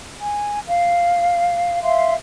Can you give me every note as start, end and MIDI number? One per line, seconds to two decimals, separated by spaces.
0.20 0.59 80
0.67 1.81 77
1.83 2.14 76
1.83 2.14 77
1.83 2.14 84